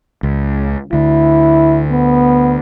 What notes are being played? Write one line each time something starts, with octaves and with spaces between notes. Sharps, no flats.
C#2
D2 D3 E4
B3